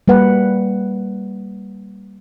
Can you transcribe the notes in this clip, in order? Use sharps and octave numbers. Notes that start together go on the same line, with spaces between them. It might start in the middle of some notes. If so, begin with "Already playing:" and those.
G3 A#3 B4 F#5